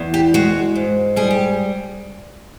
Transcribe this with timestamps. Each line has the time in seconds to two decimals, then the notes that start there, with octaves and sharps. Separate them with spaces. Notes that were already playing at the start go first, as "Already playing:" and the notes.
Already playing: E2
0.14 G4
0.34 G#3 F#4
0.76 G#2
1.16 G3 G#4
1.31 G4